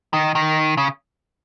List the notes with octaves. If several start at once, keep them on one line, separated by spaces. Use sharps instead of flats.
D#3
D#3
C#3